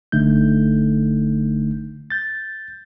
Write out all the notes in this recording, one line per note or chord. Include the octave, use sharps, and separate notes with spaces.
G1 D3 A3 D#4 G6
G6 A6